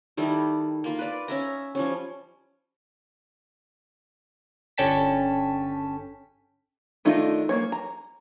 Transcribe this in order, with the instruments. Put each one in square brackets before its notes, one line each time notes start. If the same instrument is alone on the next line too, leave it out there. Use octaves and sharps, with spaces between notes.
[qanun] D#3 G3 A3 E4
A#3 F4
B4 D5
C#4 E5 A#5
F3 G3 C#4
[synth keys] G1 D3 C#4 G5 A5 B6
[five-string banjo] D#3 A3 D4 D#4 F4
A#3 C4 C#5
A#5